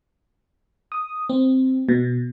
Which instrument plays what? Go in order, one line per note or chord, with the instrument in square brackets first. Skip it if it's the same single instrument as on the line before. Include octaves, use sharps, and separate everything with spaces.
[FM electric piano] D#6
C4
B2